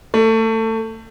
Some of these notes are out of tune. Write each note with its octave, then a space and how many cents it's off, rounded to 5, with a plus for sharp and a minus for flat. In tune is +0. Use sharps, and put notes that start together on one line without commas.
A3 +25